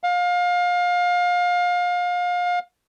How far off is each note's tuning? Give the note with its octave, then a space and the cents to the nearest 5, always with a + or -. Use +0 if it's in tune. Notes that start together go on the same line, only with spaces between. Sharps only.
F5 +30